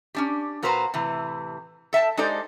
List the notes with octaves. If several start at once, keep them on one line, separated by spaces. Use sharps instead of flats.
C#4 D4 G4
A#2 A#3 F#4 B4 C5 A#5
A2 C3 E3
A4 E5 G5 A5
G#3 D#4 G4 A4 C5 D5